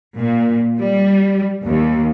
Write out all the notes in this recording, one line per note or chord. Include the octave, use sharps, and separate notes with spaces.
A#2
G3
D#2